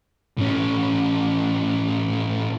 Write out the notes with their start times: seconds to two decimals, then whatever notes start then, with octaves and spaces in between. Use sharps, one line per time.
0.38 A2 C#4